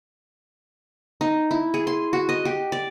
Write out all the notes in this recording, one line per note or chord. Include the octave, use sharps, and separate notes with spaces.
D#4
E4
G#4
C6
F#4
D#5
G4
D5